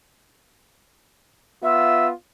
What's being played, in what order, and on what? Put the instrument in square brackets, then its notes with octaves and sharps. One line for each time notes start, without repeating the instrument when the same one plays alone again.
[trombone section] B3 F4 [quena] E5